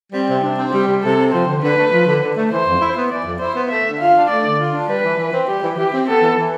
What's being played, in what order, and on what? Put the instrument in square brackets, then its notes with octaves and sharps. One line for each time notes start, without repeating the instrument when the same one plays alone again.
[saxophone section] G3 [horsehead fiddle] C4
[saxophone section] C3
[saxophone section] C3 [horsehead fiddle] D4
[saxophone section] C4
[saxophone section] G3 [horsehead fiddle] G4
[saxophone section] C3
[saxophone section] C3 [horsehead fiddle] A4
[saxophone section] C4
[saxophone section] F3 [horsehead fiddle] C5
[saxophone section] D3
[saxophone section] D3 [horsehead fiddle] B4
[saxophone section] A3
F3
D3
D3
A3
[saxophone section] E3 [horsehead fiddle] C5
[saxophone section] F2
E4
B3
[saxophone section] E3 [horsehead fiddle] D5
[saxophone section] F2
[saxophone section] E4 [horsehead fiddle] C5
[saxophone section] B3
[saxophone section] A3 [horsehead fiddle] E5
[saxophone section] D3
[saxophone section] F4 [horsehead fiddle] F5
[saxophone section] D4
[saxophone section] A3 [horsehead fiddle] D5
[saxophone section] D3
F4
D4
[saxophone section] G3 [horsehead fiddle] B4
[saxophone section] E3
E3
C4
[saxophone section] G3 [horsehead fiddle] G4
[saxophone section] E3
[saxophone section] E3 [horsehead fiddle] G4
[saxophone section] C4
[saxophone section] B3 [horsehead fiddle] A4
[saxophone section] E3
E3